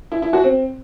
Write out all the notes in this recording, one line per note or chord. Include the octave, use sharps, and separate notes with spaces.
E4
E4
F#4
C4